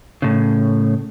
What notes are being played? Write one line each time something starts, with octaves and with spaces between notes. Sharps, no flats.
A2 C#3